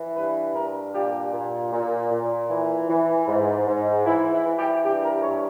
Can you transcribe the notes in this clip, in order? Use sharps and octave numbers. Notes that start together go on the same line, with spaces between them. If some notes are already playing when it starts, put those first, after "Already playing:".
Already playing: E3
G2 B4
G2 A#4
A#2 G4
A#2
A#2
A#2
E3
E3
G#2
G#2
E3 E4
E4
E3
G4
G2 G4
A#4
G2 C#5